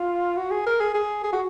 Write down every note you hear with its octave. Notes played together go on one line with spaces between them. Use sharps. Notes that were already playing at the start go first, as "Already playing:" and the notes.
Already playing: F4
F#4
G#4
A#4
G#4
G#4
G#4
F#4